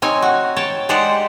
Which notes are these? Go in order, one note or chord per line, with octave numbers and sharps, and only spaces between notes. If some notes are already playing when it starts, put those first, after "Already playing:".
C4 D#4 C#5 G#5
F#4
C#5 G5 A5
G#3 D#4 G4 C5 D5 F#5